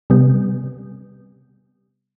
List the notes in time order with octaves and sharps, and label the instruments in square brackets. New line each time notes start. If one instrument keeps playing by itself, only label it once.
[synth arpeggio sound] C3 G3 B3